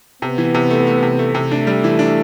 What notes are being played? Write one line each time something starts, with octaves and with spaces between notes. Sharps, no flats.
C3 B3
E3
C3
A3
A3
C3
A3
C3
A3 D4
G3
E3
D4